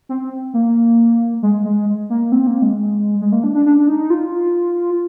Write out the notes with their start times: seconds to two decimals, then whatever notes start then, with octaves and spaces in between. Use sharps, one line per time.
0.09 C4
0.54 A#3
1.42 G#3
1.65 G#3
2.10 A#3
2.32 C4
2.47 A#3
2.62 G#3
3.21 G#3
3.32 A#3
3.44 D4
3.55 D4
3.66 D4
3.78 D4
3.88 D#4
4.10 F4